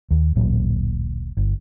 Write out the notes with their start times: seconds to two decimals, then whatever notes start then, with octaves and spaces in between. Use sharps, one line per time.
0.11 D#2
0.36 D1 A1 A#2 F#3
1.37 G1